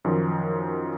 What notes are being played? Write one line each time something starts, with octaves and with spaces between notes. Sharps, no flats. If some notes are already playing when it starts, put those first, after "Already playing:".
F#2 D#3 F3